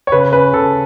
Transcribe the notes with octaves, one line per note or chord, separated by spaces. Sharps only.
C#5
C#3 B4
C#4 B4
C#3 A4